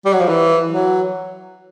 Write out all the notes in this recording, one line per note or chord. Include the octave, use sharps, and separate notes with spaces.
G3
F#3
F3
E3
F#3